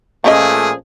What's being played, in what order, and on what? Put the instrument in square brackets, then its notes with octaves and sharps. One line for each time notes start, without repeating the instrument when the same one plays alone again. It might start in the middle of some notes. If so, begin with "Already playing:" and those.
[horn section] A#2 A3 G#4 [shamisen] F3 C#4 D#5